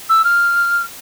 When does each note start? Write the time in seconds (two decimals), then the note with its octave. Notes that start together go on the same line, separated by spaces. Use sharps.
0.09 E6
0.24 F6